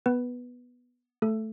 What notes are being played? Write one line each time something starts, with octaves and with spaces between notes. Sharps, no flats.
B3 B4
A3 A4